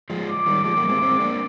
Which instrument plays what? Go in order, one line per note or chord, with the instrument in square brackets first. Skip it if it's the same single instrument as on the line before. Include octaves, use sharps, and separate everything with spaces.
[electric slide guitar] F3 G#3
[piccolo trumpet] D6
[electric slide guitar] D#3 G3
[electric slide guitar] F3 G#3 [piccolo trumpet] D6
[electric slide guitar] G3 A#3
G#3 C4
G#3 C4
A#3 D4